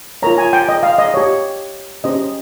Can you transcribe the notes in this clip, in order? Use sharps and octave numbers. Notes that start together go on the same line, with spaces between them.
F4 A#4 C#5 A#5
G#5
G5
D#5
F5
D#5
G4 C#5
C#4 G4 C5 D#5